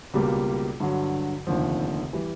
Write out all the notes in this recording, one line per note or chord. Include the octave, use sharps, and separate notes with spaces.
C#2 B2 G3 A#3
G2 D3 F#3
F1 D#2 D3 F3
E3 G3